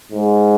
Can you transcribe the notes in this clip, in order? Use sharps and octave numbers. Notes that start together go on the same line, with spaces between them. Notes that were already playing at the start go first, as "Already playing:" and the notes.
G#2